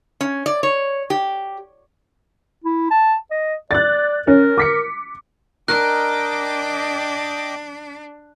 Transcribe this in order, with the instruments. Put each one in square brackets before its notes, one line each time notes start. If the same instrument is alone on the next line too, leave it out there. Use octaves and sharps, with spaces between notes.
[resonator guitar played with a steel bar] C#4
D5
C#5
G4
[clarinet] E4
A5
D#5
[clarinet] D5 [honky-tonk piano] F#6 A6
[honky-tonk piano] C#4 [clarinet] A#4
[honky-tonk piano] D6 B6 C#7
[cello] D4 [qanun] A#4 [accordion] D#5 G5 D6 [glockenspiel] F#6